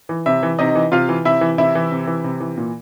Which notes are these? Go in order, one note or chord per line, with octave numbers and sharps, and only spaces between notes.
E3
C3 E4 E5
E3
C3 D#4 D#5
E3
C3 F4 F5
E3
C3 E4 E5
E3
C3 E4 E5
E3
C3
E3
C3
E3
A#2